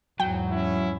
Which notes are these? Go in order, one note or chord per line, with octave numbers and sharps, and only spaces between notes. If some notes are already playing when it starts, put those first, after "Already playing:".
E2 G#2 F#3 G5
C#4 E4